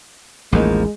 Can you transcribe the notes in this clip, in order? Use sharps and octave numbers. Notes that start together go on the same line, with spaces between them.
A1 D#2 F3 G#3 A#3 D#4